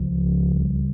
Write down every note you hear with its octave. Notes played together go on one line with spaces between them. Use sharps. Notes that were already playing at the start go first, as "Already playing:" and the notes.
Already playing: C#2 C#3 F3
D2 C#3 G3